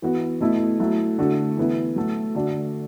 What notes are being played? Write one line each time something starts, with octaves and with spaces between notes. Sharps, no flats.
E3 B3 F#4
B2 A3 E4
F#3 A3 E4
D3 A3 D4 F#4
E3 B3 E4
F#3 A3 F#4
D3 A3 D4 F#4